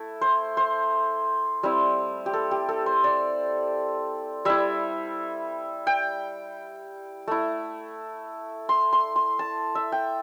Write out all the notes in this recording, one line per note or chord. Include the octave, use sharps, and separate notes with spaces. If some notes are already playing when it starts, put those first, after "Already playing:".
Already playing: A3 E4
C5
C5
G3 C4 E4
G4
A4
G4
A4
C5
D5
G3 E4 E5
G5
A3 E4
C6
C6
C6
A5
E5
G5